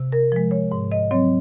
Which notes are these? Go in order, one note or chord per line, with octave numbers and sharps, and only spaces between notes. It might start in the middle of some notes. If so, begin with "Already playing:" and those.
Already playing: C3
A#4
F3 G#3
C#5
G#2
D#5
F#3 C4 C#5